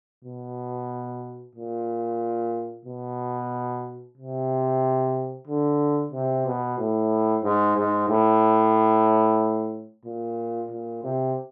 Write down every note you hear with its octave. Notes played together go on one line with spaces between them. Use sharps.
B2
A#2
B2
C3
D3
C3
B2
A2
G#2
G#2
A2
A#2
A#2
C3